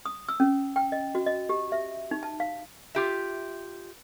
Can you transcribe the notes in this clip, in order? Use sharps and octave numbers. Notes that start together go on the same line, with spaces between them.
D#6
E6
C#4
G5
D#5
F#4
D#5
G4
E5
D#4
A5
F5
F4 G4 E5